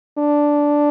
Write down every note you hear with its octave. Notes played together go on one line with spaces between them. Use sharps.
D4